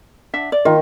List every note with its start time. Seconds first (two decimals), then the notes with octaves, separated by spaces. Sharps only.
0.34 D4 E5 F#5
0.52 D5
0.65 D#3 F4